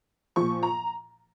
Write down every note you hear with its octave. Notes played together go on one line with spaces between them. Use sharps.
A#2 F3 C#6
A#5